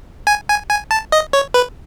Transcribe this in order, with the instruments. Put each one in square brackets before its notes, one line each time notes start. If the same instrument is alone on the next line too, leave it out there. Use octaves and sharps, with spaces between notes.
[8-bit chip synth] G#5
G#5
G#5
A5
D#5
C#5
B4